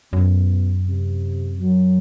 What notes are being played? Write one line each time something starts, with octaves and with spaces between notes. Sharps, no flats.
F#2 B2
C3
F#3